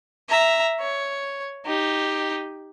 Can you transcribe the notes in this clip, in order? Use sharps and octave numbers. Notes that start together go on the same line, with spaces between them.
E5 A#5
C#5
D#4 G4